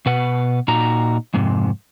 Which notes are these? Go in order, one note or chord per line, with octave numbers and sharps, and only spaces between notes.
B2 B4 F#5
A#2 D#4 F#4 A#5
F2 G#2 C3